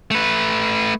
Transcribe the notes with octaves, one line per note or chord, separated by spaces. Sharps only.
A3 B4